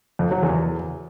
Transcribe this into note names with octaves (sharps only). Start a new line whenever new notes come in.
F2
F#3
E2